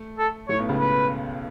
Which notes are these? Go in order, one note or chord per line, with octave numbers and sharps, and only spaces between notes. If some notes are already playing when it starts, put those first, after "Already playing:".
Already playing: A3
A4
A2 A3 C#5
B1 B2
C#2 C#3
B4